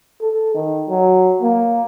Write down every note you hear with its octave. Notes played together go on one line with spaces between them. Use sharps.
A4
D#3
F#3
A#3